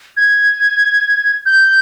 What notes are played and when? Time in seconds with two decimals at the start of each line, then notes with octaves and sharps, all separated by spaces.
0.17 G#6
1.46 G6